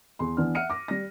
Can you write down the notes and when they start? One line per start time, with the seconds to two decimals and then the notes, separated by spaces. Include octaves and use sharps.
0.19 E2 C6
0.37 E3 B3 D4 F6
0.55 E5 F#5 F6 C#7 D#7
0.70 D6 A#6
0.88 G3 A#6